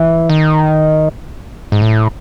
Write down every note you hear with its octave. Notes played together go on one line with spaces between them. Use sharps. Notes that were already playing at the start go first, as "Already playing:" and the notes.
Already playing: E3
D#3
G#2
A2